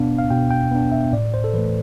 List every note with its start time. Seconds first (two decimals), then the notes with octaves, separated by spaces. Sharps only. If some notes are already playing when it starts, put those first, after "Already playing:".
Already playing: B2 B3 D4 F5
0.18 F5
0.30 B2 G5
0.51 G5
0.71 B3 D4
0.92 E5
1.13 A2 D5
1.34 C5
1.44 A4
1.54 E3 A3 B4